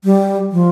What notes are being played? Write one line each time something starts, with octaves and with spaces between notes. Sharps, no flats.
G3
F3